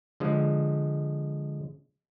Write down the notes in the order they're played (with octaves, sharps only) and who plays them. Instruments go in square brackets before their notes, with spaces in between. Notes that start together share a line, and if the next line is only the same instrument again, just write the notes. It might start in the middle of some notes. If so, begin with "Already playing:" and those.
[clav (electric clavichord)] D3 F3 G#3